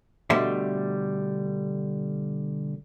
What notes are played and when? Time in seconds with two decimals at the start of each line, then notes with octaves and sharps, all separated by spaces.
0.30 B2 D3 G3 A3 C5 E5